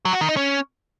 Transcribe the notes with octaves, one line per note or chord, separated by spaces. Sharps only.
F#3
F#4
D#3
D#4
C#4